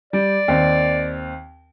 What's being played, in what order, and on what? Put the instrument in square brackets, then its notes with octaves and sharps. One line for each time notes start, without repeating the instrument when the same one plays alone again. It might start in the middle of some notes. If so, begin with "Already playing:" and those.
[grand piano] G3 [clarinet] D5
[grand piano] D#2 C4